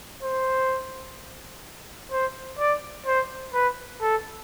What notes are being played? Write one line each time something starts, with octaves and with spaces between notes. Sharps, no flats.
C5
C5
D5
C5
B4
A4